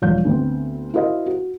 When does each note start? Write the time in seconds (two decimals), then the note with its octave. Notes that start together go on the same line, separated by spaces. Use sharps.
0.02 E1 F3 G3 C#5 F5 G6
0.25 D2 B3 C4
0.94 E4 F#4 A#4 C5 D#5 F5
1.26 F#4